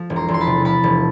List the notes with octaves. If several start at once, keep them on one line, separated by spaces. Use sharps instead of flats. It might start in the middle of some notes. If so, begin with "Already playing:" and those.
Already playing: F3
E1
A#5 C6
E2
C6
A5 B5
C3
F3 A5 B5
E1